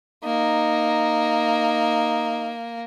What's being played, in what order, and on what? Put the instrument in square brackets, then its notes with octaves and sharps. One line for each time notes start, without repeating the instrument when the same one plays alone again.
[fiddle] A#3 [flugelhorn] D#4